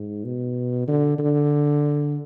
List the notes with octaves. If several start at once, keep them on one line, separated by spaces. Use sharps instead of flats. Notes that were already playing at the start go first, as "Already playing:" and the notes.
Already playing: G#2
B2
D3
D3